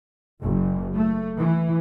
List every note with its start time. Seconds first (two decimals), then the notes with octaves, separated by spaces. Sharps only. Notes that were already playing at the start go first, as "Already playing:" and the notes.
0.42 F#1
0.94 A3
1.38 E3